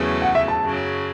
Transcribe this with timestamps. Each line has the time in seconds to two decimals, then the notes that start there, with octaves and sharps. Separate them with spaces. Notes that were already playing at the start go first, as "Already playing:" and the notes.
Already playing: E2 C#3 F#3 A3
0.22 F#5
0.35 E5
0.48 A5
0.62 F#2 C#3 F#3